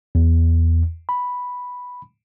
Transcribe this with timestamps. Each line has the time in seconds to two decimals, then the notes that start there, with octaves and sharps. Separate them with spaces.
0.15 E2
1.09 B5